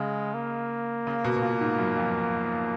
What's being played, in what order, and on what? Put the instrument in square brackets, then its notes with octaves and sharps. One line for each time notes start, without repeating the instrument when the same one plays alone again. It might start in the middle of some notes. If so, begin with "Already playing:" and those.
Already playing: [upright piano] C#3 [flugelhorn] G#3
[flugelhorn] A#3
[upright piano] C#3
B2
B2
A#2
G#2
F#2
F2